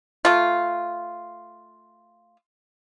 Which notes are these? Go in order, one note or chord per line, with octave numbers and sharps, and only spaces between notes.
A3 F4